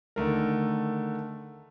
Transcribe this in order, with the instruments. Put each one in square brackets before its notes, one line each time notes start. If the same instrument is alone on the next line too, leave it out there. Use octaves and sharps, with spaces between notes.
[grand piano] D3 D#3 A3 A#4